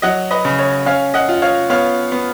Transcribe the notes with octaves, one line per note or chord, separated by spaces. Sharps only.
F#3 D#5 F#5
B4 D#5
C#3
C#5
C#4 C#5 F5
D#5 F#5
F4
C#5 F5
B3 C#5 F5
B3